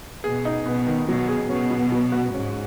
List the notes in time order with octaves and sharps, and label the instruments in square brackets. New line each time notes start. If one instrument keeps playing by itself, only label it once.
[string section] B2 [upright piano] G#4
[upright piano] D#4
[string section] B2 [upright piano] B3
[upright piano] D#3
[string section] B2 [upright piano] F#3
[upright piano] G#4
[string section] B2 [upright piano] C#4
[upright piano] F#3
F#3
F#4
[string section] G#2 [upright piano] C#4